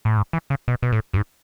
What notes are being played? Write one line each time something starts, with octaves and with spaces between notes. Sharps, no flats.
A2
G#2
E3
C#3
B2
B2
A2
F#2
G#2